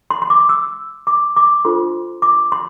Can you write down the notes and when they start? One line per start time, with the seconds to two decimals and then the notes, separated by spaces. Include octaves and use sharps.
0.10 C6
0.22 C6
0.30 D6
0.49 E6
1.07 D6
1.36 D6
1.65 D4 F4 A4 C5 C6
2.22 D6
2.52 C6